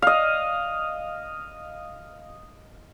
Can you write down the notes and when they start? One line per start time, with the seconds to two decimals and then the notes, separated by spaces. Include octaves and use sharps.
0.02 D#5 F5